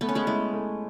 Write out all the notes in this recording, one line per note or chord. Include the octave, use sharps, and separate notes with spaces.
A3 B3
C#4
G#3 B3
G#3 E4
A3